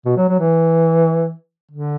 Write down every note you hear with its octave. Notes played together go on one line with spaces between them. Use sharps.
B2
F#3
F#3
E3
D3